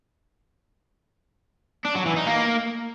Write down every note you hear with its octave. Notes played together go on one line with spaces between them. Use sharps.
D4
F#3
E3
D#4
A#3